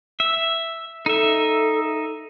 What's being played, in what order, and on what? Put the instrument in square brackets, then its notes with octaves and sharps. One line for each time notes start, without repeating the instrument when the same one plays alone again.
[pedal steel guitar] E5
[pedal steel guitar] D#4 E5 [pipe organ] A4